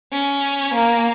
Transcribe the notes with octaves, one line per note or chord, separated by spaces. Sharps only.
C#4
A#3